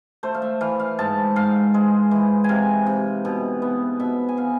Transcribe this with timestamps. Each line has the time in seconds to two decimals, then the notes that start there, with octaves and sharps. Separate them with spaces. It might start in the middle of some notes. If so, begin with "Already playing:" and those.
0.23 A3 C5
0.34 F5
0.42 E5
0.61 E3 F5
0.80 F5
0.99 G#2 A5
1.36 G#2 F5
1.74 G#3
2.11 E3
2.44 C3 F5 G#5
2.86 C3
3.25 B2
3.62 B3
4.00 B2 E5
4.29 G#5
4.37 B3 F5